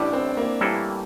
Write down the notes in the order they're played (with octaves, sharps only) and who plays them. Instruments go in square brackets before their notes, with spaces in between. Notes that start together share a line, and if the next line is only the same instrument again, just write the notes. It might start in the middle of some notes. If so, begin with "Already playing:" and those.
Already playing: [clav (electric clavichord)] A1 A2 G3 [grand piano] D4 E4
[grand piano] C4
A#3
[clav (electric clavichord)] A2 E3 A#3 E4 A4 [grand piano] G3